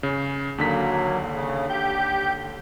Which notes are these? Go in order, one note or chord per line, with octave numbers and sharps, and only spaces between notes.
C#3
D#2 D3 F#3 A#3 B6
C#3
G4 G6